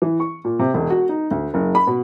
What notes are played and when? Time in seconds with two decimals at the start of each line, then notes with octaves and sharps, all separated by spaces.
0.02 E3
0.20 C#6
0.45 A#2
0.59 C3
0.74 E1
0.90 F#4
1.09 D#4
1.31 D2
1.54 F#1
1.75 B5
1.87 B2